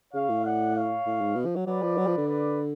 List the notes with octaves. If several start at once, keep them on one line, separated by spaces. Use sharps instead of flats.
C#3 C#5 F5
A2
D5 F#5
C#5 F5
A2
G#2
B2
F3
F#3
F#3 B4 D5
F3
F#3
F3
D3
B4 D5